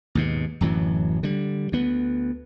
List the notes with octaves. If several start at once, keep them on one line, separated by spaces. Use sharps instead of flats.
D#2 G#2 B2
D1 F#2 E3 F#3
D3 G3
D2 B3